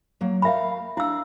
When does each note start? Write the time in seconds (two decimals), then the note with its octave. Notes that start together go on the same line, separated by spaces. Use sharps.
0.21 F#3 A#3
0.42 A3 A#4 E5 F5 B5
0.97 D4 E4 F5 E6